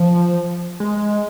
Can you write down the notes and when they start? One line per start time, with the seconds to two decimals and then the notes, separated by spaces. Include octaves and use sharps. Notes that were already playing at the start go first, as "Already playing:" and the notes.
Already playing: F3
0.80 G#3